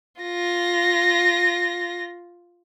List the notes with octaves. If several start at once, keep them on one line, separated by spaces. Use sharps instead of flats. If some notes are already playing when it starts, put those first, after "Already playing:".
F4 A#6